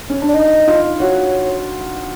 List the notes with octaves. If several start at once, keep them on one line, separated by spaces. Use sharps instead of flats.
C#4
D4
D5
D#4 D#5
F4
F#4 C#5